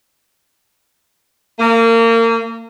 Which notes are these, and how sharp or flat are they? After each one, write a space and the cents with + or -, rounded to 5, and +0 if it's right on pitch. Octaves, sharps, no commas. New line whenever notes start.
A#3 -30